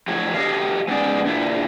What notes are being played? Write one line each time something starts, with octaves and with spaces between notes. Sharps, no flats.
F2 A2 F#4 C#5
F#4 G4 A4 C#5 D#5 F5
G#3 B3 C#4 D#4 D5
A#2 D4 E4